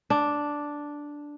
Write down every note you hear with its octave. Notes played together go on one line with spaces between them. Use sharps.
D4